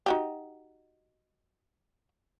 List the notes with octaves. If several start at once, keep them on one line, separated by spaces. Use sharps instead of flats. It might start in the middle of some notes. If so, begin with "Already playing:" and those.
D#4 F#4 G4